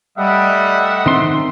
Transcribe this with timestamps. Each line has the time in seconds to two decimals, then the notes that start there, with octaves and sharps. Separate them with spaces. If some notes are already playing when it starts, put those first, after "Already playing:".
0.18 G3 A3 D#5 E5 F#5
1.06 D#3 C4 C6